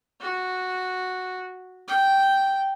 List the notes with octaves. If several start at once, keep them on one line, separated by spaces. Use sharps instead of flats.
F#4
G5